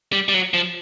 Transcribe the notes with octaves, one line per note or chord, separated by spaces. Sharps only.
G3
G3
F#3
F3